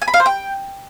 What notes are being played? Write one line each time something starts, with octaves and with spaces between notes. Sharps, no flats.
G#5
B5
F5
C5
G5